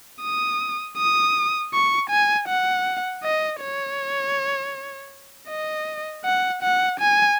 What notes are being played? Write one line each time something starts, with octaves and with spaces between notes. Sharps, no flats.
D#6
D#6
C#6
G#5
F#5
D#5
C#5
D#5
F#5
F#5
G#5